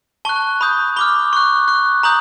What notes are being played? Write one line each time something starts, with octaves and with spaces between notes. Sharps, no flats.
A5 C#6 F#6 G7
B5 D#6 G6
B5 D6 F6 G7
C#6 F#6
C#6 F#6
A#5 D#6 G6 F#7